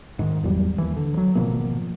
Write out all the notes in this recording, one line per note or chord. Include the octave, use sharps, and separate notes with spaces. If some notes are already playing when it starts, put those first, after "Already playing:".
G#2 D#3
G#1 E2 F#3 G3
D#2 E3
D3
F#3
G#1 B2 F3 A#3